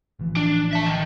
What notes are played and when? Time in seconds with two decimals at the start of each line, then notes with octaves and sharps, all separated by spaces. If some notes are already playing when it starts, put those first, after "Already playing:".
0.19 A1 E3 F3
0.37 D4
0.73 E5 A5
0.86 D#3